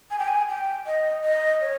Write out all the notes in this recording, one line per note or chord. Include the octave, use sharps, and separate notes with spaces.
G#5
G5
G#5
G5
D#5
D#5
C#5